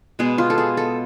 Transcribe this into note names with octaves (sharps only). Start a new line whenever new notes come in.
B2 G#3 B3 G#4
F4
A4
G#4
A4